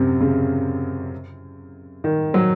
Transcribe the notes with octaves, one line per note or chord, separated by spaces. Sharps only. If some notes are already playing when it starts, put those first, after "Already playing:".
Already playing: F#2 C3
C#3
D#3
F#3